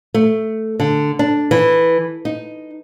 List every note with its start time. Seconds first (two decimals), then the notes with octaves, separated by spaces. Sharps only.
0.14 A3
0.80 D3
1.19 D4
1.51 E3
2.25 D#4